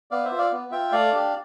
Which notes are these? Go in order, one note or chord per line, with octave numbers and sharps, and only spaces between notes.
B3 D5 F5
C5 E5
F4
D5 F5
B3
F4 E5 G5
A3 D5 F5
D4 G4